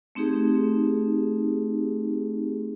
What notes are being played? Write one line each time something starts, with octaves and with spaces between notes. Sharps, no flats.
A3 C4 D#4 G4 G#4